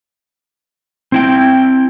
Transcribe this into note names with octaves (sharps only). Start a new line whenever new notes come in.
C4 E4 G5